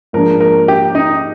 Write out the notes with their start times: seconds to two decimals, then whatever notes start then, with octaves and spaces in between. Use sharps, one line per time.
0.13 G#2 F3 A#3 D4 A#4
0.40 A#4
0.68 G4
0.95 D#4